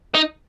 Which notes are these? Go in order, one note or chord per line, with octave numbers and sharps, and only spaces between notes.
D#4